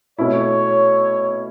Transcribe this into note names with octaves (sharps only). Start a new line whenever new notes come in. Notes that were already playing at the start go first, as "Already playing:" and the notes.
B2 A3 C#4 E4 C#5